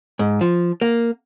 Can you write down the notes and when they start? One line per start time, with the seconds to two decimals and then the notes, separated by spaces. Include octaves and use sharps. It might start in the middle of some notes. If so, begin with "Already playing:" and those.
0.19 G#2
0.41 F3
0.81 A#3